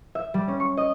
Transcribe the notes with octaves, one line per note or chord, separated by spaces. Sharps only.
E5
G3
C#4
C#6
D#5